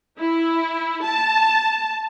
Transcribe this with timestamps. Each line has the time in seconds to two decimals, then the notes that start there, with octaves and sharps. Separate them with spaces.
0.18 E4
1.04 A5